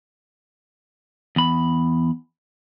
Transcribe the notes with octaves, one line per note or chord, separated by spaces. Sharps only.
E2 B5